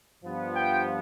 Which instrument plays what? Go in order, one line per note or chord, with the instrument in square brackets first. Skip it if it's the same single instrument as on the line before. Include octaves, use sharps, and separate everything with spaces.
[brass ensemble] G2 F3 B3
G5